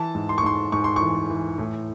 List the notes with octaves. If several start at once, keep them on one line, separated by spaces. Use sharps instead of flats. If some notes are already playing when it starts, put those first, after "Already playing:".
Already playing: E3 A5
G#2
C6
C#6
G#2 C6
G#2 C#6
C6
E3 C#6
E3
A2